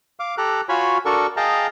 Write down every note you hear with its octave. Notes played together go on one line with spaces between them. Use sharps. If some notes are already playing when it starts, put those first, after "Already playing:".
F5 D6
G4 A4 A#5 F#6
F4 F#4 C#5 G#5 B5
D4 F#4 A4 A#4 C#6
G#4 D#5 F5 G5 A5 A#5